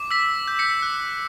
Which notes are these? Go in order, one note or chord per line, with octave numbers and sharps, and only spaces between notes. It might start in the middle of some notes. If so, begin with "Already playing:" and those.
Already playing: D6
E6 B6
G6
B6 C#7
F#6